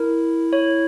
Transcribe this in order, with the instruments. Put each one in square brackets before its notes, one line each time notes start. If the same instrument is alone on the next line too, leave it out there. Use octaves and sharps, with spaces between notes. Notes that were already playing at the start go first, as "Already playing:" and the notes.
Already playing: [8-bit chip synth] E4 [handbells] A#4
[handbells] C#5